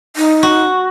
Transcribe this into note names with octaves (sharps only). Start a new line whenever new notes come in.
D#4
F#4